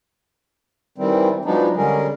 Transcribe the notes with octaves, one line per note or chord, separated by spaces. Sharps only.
D#3 E3 G3 C4
F3 F#3 G#3 B3 D4 D#4
D3 G3 G#3 C#4 G#4 A#4